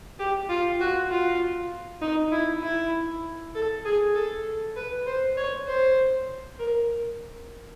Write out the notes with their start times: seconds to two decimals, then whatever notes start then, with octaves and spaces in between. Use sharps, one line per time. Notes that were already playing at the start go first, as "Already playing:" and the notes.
0.19 G4
0.50 F4
0.80 F#4
1.10 F4
2.02 D#4
2.32 E4
2.63 E4
3.55 A4
3.85 G#4
4.15 A4
4.76 B4
5.06 C5
5.37 C#5
5.67 C5
6.59 A#4